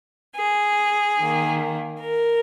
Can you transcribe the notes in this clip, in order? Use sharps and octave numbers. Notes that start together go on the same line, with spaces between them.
G#4
D#3 A#3
A#4